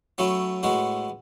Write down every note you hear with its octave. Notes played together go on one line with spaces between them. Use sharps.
F#3 A3 C#4 E4
A2 G#3 B3 F#4